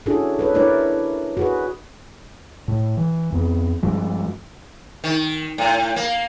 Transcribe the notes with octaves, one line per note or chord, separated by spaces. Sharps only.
C#4 D4 E4 F#4 G#4 A4
A4 B4 C#5
D4 E4 A#4 B4 C#5 D5
F#4 G#4 B4
A2
E3
F2 B3
G2 F3 G#3
D#3
A2
A#3